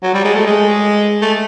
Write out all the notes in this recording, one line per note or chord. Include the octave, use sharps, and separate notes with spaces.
F#3
G3
G#3
A3
G#3
A3